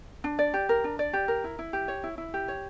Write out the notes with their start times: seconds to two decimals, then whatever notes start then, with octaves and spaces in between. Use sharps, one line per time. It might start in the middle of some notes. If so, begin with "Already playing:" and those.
0.24 D4
0.39 D5
0.54 G4
0.69 A#4
0.84 D4
0.99 D5
1.13 G4
1.28 A#4
1.44 E4
1.59 E4
1.73 G4
1.88 C#5
2.04 E4
2.18 E4
2.34 G4
2.48 C#5